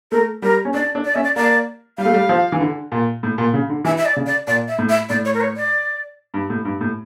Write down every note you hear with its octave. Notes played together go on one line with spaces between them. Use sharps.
A3 A#4
G3 A#4
C#4
D4 D5
D4
D5
C#4 E5
D5
A#3 D5
G3 F5
A3
G3
F3
E3
D3
A#2
A2
A#2
C#3
D3
E3 E5
E5
D5
C#3
D5
A#2 D5
E5
A2
E5
A2 D5
C#5
A#4
C#5
D5
G2
A2
G2
A2